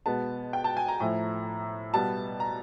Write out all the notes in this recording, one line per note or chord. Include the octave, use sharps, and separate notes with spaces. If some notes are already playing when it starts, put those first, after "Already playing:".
B2 G#3 B3 A5
G5
A5
G#5
A#5
A2 F3 A3
B2 G3 B3 A5
A#5